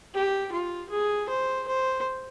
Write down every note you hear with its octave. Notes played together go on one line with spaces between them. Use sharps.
G4
F4
G#4
C5
C5